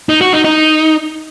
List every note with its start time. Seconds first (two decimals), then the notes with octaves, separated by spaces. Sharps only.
0.09 D#4
0.21 F#4
0.33 D#4
0.44 D#4